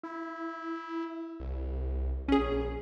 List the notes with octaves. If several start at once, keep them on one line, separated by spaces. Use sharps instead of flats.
E4
C2
A#1 C#4 G#4